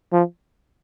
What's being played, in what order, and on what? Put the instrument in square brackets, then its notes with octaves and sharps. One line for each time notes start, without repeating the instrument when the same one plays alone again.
[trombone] F3